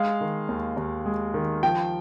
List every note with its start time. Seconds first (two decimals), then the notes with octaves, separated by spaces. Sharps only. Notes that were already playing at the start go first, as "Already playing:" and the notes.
Already playing: G#3 F5
0.21 D#3
0.49 D#2
0.77 D#2
1.06 G#3
1.34 D#3
1.63 F3 G5